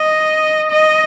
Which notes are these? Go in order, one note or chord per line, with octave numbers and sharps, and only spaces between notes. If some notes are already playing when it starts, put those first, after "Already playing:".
Already playing: D#5
D#5